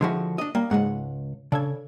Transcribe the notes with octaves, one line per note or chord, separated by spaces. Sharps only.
D3 F3 G#3 E4 F#4
D4 D#5
G3 A#3
C#2 G#2 G#3 F#5
C#3 D4 A4 G#6